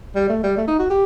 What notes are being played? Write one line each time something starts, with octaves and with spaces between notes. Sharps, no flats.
G3
A3
G3
A3
D#4
F#4
G4